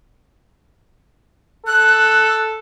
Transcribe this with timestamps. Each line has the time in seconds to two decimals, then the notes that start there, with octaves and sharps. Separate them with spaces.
1.66 A4 F#6